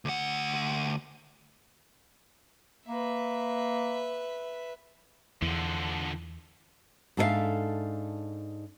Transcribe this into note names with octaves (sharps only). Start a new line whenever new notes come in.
D2 F#5
A#3 B4 E5
E2 D3 F3
G#2 D4 A4 B4 E5 F5